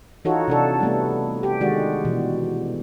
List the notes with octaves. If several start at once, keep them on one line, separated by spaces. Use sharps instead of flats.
E3 D#4 F4 F#4 A4 C#5
C3 D4 A4
G3 A3 B3
G4
D#3 G#3 D4 F#4 D5
B2 E3